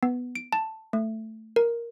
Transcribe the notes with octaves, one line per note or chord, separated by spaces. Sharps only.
B3
D7
A5
A3
A#4